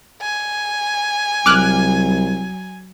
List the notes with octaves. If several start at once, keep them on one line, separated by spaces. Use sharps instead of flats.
G#5
C2 F#3 D6 F6 F#6